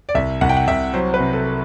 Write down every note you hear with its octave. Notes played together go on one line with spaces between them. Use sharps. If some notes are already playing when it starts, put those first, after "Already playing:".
D5
C2 E5
C2 F#5
G5
F#5
C2 E5
F#3 C5
B4
C3
A4